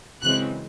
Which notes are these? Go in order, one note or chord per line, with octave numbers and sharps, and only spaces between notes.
F#2 C#3 E3 G#3 C4 F#6